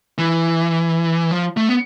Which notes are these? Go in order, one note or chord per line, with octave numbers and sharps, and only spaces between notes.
E3
F3
A3
B3